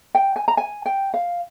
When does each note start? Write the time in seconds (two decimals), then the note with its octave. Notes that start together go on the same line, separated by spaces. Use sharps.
0.15 G5
0.36 G#5
0.48 A#5
0.57 G#5
0.86 G5
1.14 F5